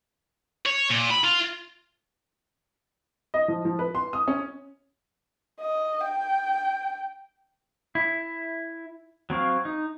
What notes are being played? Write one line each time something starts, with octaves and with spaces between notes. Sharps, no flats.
C#5
A#2
B5
F4
D#5
F3
F3
B4
C6
D#6
C#4
D#5
G5
E4
F#3 C4 C#5 F5
D#4